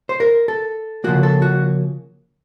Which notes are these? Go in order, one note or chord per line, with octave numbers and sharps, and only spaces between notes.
C5
A#4
A4
C#3 F3 A#3 F#4
A4
F#4